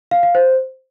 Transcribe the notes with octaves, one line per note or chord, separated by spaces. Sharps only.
F5
F5
C5